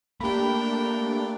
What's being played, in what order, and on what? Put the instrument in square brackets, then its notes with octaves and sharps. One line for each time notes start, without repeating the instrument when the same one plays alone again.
[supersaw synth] A3 D4 [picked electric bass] A#3 [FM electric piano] G4 B5 [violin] A#4 G5